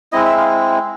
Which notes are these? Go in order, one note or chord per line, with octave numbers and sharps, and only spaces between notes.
G#3 C4 E4 D#5
E5
F5